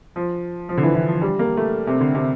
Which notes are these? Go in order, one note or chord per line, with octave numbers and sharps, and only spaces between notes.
F3
F3
D3
E3
E3
F3
G3
A#3
A3
C3
D3
C3